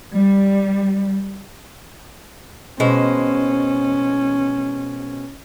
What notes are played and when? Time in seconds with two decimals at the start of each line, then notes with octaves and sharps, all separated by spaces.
0.15 G3
2.80 B2 G#3 C#4 C5